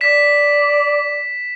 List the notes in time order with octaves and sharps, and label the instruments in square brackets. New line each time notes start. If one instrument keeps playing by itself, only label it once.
[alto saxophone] D5 [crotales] B6 E7